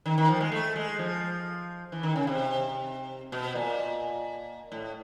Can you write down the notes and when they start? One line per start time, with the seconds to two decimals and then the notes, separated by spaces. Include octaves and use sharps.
0.05 D#3
0.18 D#3
0.29 F3
0.40 G#3
0.52 A3
0.76 G#3
0.99 F3
1.92 E3
2.03 D#3
2.16 C#3
2.27 C3
3.32 B2
3.55 A#2
4.72 A2